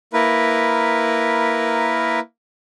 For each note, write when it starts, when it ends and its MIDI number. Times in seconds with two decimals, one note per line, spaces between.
0.13 2.20 58
0.13 2.20 64
0.13 2.20 70
0.13 2.20 71